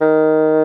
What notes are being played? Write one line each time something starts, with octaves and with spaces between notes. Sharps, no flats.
D#3